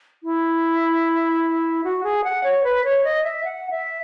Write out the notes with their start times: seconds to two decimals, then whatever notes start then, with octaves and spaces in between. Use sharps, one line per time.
0.23 E4
1.84 F#4
2.04 G#4
2.24 F#5
2.44 C#5
2.64 B4
2.84 C#5
3.04 D#5
3.24 E5
3.44 F#5
3.70 E5